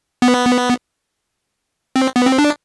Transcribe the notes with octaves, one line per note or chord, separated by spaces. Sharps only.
B3
C4
B3
C4
D4